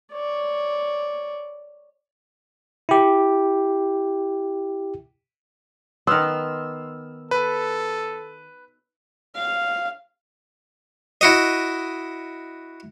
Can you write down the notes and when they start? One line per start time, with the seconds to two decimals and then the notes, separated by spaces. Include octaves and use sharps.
0.12 C#5 D5
2.89 E4 G4
6.07 D#3 B3 C6 E6 F6
7.31 A4 B4
9.36 F5
11.21 E4 F#4 D#5